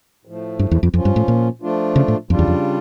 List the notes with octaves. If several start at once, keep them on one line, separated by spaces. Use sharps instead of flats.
A2 F3 A3
G2
E2
F2
F2 F3 C#4 F4
G2
A2
A#2
F3 A3 D4 F4
C#3
A2
F2 C#3 G3 D4 F4
E2
F2